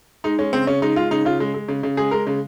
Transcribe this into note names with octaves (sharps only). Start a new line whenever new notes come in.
G#3 D#4
G#3 C#4
C#3 C4
C#3 C#4
G#3 D#4
G#3 F4
C#3 D#4
C#3 F4
G#3
G#3
C#3
C#3
G#3 G#4
G#3 A#4
C#3